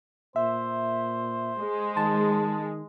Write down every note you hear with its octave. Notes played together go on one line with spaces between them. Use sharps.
A#2 C5 E5
G#3
D#3 A5